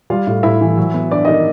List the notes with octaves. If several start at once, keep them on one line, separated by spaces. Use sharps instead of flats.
G3 F4 F5
A2
A2 E4 E5
E3
F#3
B3
G2 D5
D#3 D#5